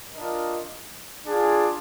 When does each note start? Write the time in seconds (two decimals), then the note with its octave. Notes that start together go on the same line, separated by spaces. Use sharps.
0.15 D4 F4 A#4 D#5
1.27 D4 F4 G#4